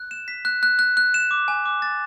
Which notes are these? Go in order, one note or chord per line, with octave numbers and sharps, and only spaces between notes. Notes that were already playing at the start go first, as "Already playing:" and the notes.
Already playing: F#6
E7
B6
F#6
F#6
F#6
F#6
E7
D6
G#5
D6
A6